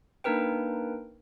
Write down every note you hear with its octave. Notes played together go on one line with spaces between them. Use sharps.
A#3 D4 D#4 A#4 B4 G5